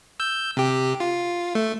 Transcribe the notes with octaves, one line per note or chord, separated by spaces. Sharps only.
E6 G6
C3 G4
F4
A3